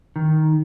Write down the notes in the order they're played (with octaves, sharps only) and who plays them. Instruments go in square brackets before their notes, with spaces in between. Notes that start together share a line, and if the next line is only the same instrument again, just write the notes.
[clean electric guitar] D#3